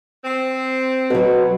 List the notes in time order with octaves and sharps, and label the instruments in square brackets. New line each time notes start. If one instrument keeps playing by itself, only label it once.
[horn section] C4
[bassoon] B2 [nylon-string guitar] F#3 B4